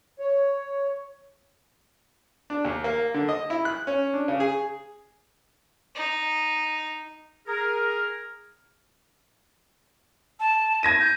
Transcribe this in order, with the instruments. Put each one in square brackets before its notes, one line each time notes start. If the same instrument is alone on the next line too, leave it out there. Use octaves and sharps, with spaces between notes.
[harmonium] C#5
[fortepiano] D4
D#2
A#3
D3
D#5
E4
F#6
C#4
D4
C#3
G#4
[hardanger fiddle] D#4
[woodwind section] G#4 A#4
[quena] A5
[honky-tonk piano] G#6 A#6 D#7
[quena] G6